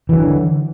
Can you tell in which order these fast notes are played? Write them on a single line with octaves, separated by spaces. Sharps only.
E3 F#3 D3